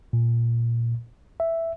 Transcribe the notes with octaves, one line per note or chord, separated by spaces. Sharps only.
A#2
E5